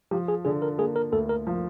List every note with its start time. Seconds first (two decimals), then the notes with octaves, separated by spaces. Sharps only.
0.11 F3 G4
0.28 G#4
0.45 D3 G#4
0.62 A#4
0.78 A#3 G#4
0.96 A#4
1.12 D2 A4
1.29 A#4
1.47 F3